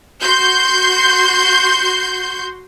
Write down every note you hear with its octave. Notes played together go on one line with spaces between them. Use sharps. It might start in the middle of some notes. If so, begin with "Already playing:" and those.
F#4 C6 G6